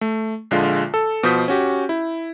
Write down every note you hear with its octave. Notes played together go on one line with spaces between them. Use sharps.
A3
A#1 D3 G#3 F4
A4
B2 F3 C5 D#6 G6 B6
C#4 F#4 G4
E4